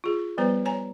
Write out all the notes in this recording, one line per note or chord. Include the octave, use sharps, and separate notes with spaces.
F4 G#4
F3 G3 B3 B4 C5 A#5
C#5 G#5 A#5